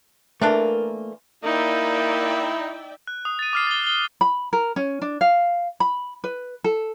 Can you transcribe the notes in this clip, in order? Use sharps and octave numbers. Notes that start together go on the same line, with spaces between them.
E3 A3 A#3 D4 F4 A#4 E5 F#6
A#3 D#4 E4 D5 E5 G5
F#6
D#6
A6 D#7
D6 F6 C7
A6 G7
G7
B5
A#4
C#4
D4
F5
B5
B4
A4